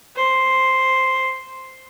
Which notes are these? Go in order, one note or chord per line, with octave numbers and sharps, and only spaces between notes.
C5